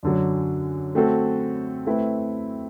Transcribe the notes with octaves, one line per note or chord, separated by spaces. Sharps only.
F#2 D3 F#3
A3 C4 F#4 A4
A3 C4 E4 B4